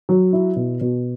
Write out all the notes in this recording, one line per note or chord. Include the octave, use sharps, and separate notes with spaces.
F#3
E4
B2
B2